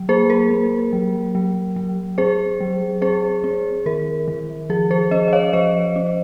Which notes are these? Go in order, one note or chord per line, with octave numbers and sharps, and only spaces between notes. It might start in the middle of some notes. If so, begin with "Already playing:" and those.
Already playing: F#3
A#3 G#4 C5
A#4
A#3
F#3
F#3
F#3
C4 G#4 C5
F#3
C4 G#4 C5
C4
D#3 A#4
D#3
F3 G#4
G#4 C5
C#4 C5 D#5
D#5
C#5 F5
F3 C5 D#5
C#4